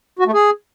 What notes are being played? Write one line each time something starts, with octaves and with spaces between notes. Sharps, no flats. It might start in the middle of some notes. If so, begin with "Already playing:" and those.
F#4
A3
G#4